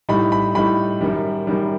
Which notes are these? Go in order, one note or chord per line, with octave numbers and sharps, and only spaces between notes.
A2 G3 D#4 B5
B5
A2 G3 D#4 B5
F#2 D#3 G3
F#2 D#3 G3